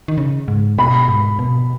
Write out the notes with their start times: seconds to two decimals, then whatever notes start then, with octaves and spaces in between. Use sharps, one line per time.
0.08 D#3
0.18 C#3
0.48 G#2
0.78 B2 B5
1.09 G#2
1.39 B2